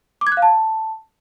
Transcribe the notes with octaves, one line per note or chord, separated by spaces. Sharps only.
D6
G#6
F#6
F5
A5